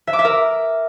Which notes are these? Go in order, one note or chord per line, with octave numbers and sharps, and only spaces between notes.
E5
D6
E5
A#4